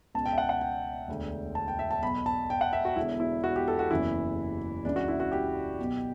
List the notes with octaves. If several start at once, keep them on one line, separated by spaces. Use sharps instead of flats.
C#2 B2 A5
G5
E5
F#5
F#5
G5
E1 D2 D3
A5
G5
E5
A5
B1 B2 B5
A5
G5
F#5
E5
F#4
E1 E2 D3 E4
E4
F#4
G4
A4
F#4
F#1 E2 C#3 E3 E4
C#2 C#3 E3 D4
F#4
E4
F#4
G4
B1 B2